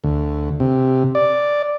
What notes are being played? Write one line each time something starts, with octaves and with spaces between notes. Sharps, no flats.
D2
C3
D5